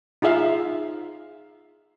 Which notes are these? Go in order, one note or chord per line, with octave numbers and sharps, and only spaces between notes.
D#4 F4 G#4 E5 F5